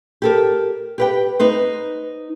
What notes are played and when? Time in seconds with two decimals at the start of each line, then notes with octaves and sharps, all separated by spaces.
0.22 G4 A4 A#4
0.98 G4 B4 G5
1.39 D#4 B4 C5